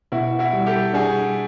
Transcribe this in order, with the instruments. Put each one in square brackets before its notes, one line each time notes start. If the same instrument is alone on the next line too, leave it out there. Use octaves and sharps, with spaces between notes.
[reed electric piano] B2 [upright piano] E4 F#4
[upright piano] E4 F#4
[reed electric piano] G3
[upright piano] G4 A4
[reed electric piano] D4 [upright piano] F#4 G#4